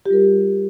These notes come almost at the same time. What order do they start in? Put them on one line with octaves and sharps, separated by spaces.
G4 F4 G3 A#4